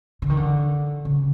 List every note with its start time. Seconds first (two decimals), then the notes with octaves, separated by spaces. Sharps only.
0.22 D3
0.30 D#3
0.37 D3
1.05 C#3